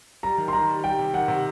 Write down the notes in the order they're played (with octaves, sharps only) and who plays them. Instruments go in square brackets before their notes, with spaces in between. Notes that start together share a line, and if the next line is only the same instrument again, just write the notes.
[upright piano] G3 [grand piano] A#5
[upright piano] D#3
[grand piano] C6
[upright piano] D#3 [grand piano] A#5
[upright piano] G3
[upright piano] G3 [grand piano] G5
[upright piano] C3
[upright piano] D#3 [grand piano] F#5
[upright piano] C3